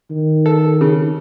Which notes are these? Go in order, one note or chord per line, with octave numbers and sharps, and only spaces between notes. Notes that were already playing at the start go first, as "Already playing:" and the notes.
D#3
A4
C#3